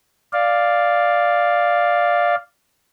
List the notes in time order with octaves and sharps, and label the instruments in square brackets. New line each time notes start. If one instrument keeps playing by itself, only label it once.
[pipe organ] D5 F5